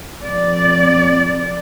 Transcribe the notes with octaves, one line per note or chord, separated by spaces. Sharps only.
F2 D5